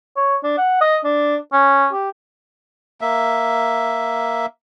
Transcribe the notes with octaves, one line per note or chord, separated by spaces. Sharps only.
C#5
D4
F#5
D#5
D4
C#4
G4
A#3 E5